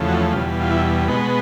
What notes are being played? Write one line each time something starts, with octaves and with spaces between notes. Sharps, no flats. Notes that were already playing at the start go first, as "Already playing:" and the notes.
Already playing: E2 C#3 F3 A3
F#4
E2 B2 G3 F4
F4
E4
B2 G#3 B3 D#4